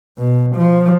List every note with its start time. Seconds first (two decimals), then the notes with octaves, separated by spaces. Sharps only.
0.19 B2
0.56 F3